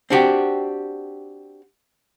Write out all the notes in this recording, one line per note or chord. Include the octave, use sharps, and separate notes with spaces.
C4 D4 F#4 G4